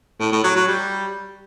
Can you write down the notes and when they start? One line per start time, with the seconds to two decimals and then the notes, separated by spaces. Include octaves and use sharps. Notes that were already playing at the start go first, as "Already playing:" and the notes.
0.20 A2
0.32 A2
0.44 F#3
0.56 F#3
0.68 G3